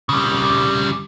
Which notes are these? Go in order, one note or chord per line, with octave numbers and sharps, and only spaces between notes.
C#3 G3